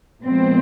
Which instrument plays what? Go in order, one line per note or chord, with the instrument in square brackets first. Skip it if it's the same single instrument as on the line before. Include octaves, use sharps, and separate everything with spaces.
[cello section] A#2 F3 G#3 B3 C4